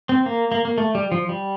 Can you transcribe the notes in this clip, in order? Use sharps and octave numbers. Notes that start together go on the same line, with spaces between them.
C4
A#3
A#3
A#3
A3
G3
F3
G3